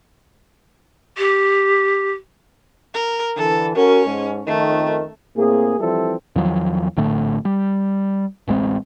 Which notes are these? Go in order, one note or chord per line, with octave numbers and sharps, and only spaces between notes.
G4
A#4
D3 E3 A4
C#4 F#4 A#4
G#2
F2 D#3 A3
A2 A#3 C4 G#4
E3 F3 G3 C4 E4 A4
E2 D#3 F3 F#3
A#1 A2 D3 A3
G3
D1 A1 G#3 C4